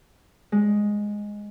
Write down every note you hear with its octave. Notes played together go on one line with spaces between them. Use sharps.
G#3